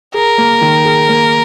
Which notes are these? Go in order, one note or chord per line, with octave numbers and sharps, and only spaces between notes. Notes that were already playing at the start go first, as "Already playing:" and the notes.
G#4 A#4
A#3
D#3
G#4
A#3